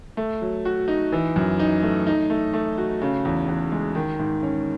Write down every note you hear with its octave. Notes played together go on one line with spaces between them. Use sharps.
A3
F#3
F#4
D#4
E3
F#2
D#4
A3
D#4
A3
A3
F#4
C#3
E2
E2
G#3
D#3
G#2
C#4